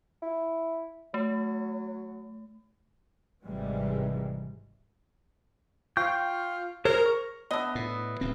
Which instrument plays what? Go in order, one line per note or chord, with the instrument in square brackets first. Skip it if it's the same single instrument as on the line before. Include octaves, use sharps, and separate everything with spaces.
[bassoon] E4
[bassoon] F#3 [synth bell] A3
[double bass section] G#1 G#2 C3 E3 G3 G#3
[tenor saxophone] F4 [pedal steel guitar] G5 C#6 G6
[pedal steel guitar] G#4 C5 C#5 [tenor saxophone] A#4
[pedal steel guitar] C#6
[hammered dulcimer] B3 E5 [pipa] D4 D#5
[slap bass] A2
D1 D2 C4